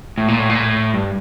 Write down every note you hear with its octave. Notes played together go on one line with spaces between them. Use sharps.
A2
A#2
A2
A#2
A2
G2